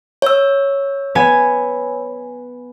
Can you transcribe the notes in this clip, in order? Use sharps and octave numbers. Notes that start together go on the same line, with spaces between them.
C#5 E6
B3 G#5